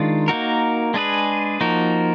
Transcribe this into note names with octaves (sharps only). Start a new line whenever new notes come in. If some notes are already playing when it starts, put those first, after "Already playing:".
Already playing: D#3 G#3 D4 F4
A#3 D#4 F#4 A#4
G#3 D4 G#4 B4
F3 A#3 D#4 F#4 A#4